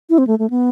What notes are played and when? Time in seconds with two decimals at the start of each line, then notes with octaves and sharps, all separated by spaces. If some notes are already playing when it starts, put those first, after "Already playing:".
0.10 E4
0.18 C4
0.27 A3
0.39 A3
0.50 B3